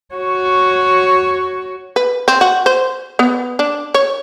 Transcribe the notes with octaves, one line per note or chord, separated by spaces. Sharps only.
F#4 C#5
B4
C4
F#4
C5
B3
D4
C#5